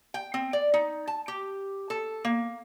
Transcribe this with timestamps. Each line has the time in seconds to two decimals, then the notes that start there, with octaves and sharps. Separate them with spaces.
0.14 G5
0.34 C4
0.53 D5
0.74 D#4
1.07 A5
1.28 G4
1.90 A4
2.25 A#3